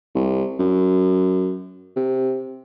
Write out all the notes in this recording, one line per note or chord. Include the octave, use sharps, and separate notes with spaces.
C2
F#2
C3